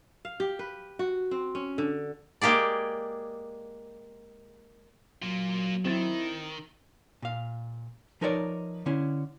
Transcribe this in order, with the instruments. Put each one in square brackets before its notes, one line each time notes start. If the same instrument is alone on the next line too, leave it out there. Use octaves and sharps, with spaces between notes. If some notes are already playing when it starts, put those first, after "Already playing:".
[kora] F5
G4
B4
F#4
C4
C#4
D3
[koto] G#3 A#3 G4 G#4 D5
[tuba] F#3 [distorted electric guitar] A#3 F4
[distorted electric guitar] D#3 [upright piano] C4 A6 [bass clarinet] E4
[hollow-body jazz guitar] A#2 F5
F3 D#4 A#4 B4 C#5 D5
D3 C#4 E4